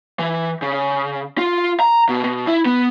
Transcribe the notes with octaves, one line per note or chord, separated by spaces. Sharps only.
E3
C#3
F4
A#5
B2
B2
E4
B3